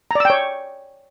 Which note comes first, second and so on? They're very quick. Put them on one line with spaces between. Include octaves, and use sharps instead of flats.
A#5 D5 E6 G5 C#5